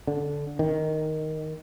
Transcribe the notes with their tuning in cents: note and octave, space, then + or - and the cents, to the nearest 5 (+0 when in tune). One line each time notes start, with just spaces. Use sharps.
D3 -10
D#3 +0